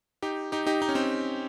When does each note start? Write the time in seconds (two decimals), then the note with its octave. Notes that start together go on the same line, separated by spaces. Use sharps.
0.22 D#4 G4
0.52 D#4 G4
0.66 D#4 G4
0.82 D#4
0.89 C#4
0.95 C4 D#4